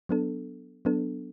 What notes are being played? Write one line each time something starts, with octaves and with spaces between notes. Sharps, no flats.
F#3 B3 D4 A4
F#3 B3 D4 A4